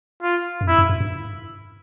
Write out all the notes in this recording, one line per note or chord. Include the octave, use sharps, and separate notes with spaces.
F4
F#2
F2 E4
F#2
F#2
G2